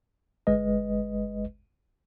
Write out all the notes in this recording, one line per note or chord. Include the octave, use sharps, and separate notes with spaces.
G1 G#3 B4 D#5